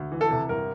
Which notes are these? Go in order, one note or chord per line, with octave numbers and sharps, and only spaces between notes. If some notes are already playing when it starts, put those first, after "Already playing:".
Already playing: D2
E3
A4
C3
G1 A#4